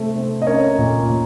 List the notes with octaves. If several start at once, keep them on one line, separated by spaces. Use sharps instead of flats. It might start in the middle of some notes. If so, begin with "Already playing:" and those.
Already playing: C3 A3 C4
C4
D#5
C#4 A#4 C#5
A#2
A#2